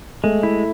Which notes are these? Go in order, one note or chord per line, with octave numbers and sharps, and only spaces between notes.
G#3 A3
E4